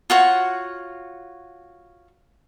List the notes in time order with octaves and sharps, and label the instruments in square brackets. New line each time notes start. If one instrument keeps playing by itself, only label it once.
[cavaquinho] F4 F#4 C#5